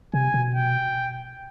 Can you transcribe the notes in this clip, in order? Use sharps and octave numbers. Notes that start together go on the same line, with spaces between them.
C3 G#5
B2
G5